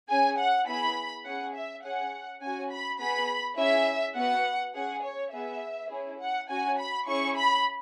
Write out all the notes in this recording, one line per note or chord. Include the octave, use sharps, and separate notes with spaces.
C#4 G#4 G#5
F#5
B3 E4 G#4 B5
C#4 G#4 F#5
E5
C#4 G#4 F#5
C#4 F#4 G#5
B5
B3 G#4 B5
C#4 E4 G#4 E5
B3 F#4 F#5
C#4 G#4 F#5
C#5
B3 G#4 E5
C#4 E4 G#4
F#5
C#4 F#4 G#5
B5
C#4 E4 G#4 C#6
B5